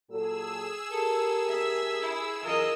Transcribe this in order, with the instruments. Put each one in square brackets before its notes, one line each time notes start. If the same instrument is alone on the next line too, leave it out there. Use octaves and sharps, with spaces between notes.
[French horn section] A#2 F#3 A4 [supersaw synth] G#4 E6
[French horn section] G4 A#4 [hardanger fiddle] A4
[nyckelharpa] E5
[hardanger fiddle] E4
[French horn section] F#2 C#3 E3 [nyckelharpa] F4 D#5 [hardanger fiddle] A#4